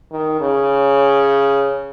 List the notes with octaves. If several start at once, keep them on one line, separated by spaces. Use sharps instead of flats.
D#3
C#3